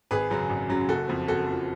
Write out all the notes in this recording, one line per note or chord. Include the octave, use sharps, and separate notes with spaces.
G#1 G#4 B4
F#2 C#3 F#3
G#1
F#2 C#3 F#3
F#1 F#4 A4
F2 F3
F#1 F#4 A4
F2 F3